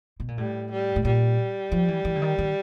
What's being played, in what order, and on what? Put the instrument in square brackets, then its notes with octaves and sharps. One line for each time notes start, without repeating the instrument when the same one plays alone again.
[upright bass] B2
A#2
[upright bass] A2 [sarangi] G3
[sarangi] G3
[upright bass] A2
[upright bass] A#2 [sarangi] G3
[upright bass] F3
E3
E3
D3
D#3
D#3